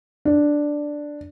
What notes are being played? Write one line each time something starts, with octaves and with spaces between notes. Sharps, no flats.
D4